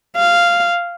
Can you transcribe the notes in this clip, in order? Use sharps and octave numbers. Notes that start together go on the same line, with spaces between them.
F5